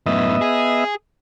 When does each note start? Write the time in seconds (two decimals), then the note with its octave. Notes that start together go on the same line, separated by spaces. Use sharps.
0.06 F#2 A2 B3 D#5 E5
0.41 G#4